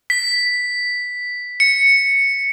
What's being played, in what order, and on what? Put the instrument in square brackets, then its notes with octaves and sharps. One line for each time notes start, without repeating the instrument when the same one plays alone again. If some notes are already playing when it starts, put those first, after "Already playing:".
[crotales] B6
C#7